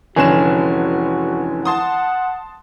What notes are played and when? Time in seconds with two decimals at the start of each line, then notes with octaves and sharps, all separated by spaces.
0.16 F1 D3 E3 G#3 C#4 F#4 G#5 E7
1.65 F#5 A5 C6 D#6